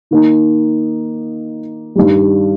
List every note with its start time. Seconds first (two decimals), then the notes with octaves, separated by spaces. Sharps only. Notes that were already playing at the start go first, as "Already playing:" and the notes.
0.11 D#3 A#3 D#4
1.95 G2 D#3 G3